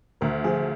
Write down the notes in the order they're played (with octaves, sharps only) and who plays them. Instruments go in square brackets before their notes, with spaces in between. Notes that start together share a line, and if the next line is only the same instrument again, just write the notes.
[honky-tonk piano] D2 [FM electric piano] A#4
[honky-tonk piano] F3 [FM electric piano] G#4